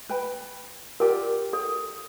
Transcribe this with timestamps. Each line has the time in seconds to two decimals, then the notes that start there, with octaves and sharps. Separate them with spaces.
0.09 B4 G5 B5
1.00 F4 G4 A#4 D5
1.53 A4